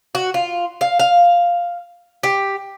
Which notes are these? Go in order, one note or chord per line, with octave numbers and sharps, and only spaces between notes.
F#4
F4
F5
F5
G4